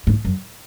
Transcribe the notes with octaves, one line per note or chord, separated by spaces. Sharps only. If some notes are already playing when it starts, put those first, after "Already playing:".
G#2
F#2